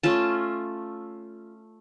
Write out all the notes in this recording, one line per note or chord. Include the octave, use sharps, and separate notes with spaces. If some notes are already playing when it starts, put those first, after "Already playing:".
A3 C#4 F4 A5